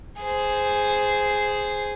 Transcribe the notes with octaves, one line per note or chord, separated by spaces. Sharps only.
G#4 C5